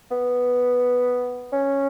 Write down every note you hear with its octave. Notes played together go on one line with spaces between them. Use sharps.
B3
C#4